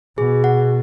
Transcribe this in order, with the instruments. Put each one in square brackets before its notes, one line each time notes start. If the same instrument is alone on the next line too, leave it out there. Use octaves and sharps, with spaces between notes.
[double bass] B2 [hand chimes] G#4
[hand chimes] F#5